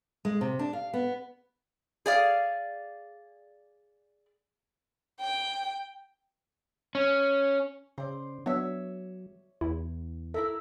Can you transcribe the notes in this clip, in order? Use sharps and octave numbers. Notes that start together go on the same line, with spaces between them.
G#3
C3
D4
F5
B3
G#4 D5 F5
G5
C#4
C#3 C5 D5
F#3 B3 D4 C#5 E5
E2 E4
E4 A4 A#4 E5